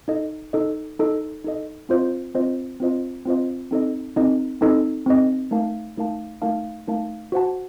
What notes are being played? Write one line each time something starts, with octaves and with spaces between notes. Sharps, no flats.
D#4 A4 D#5
D#4 A4 D#5
D#4 A4 D#5
D#4 A4 D#5
C4 F4 C5 D#5
C4 F4 C5 D#5
C4 F4 C5 D#5
C4 F4 C5 D#5
C4 D#4 A4 D#5
C4 D#4 A4 D#5
C4 D#4 A4 D#5
C4 D#4 A4 D#5
A3 D#4 A#4 F5 A5
A3 D#4 A#4 F5 A5
A3 D#4 A#4 F5 A5
A3 D#4 A#4 F5 A5
F#4 C5 F#5 A5